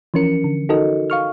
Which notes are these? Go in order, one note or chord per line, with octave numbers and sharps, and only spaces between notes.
E3 F3 C#4 A#4 C#7
D3
D#4 F#4 A4 A#4 D#5
F5 C#6 F6